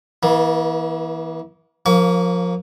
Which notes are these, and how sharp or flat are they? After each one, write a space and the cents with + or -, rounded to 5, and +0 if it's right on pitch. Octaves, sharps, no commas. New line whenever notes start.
E3 -15 A#3 +45
F3 +25 A#3 +0 C#6 +40